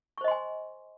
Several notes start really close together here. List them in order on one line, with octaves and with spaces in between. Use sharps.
C#6 C5 D#5 C6 G#5